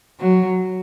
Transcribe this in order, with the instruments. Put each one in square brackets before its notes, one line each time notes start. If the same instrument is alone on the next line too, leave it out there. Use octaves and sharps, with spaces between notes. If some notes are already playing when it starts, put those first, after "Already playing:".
[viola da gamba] F#3